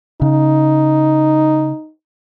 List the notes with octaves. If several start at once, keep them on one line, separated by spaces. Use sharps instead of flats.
C#3 D#4